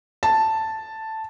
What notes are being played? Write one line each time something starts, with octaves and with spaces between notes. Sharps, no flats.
A5